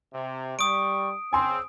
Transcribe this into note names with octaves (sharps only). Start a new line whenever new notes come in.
C3
G3 C#6 D#6 D7
C#3 C4 G#5 C6 E6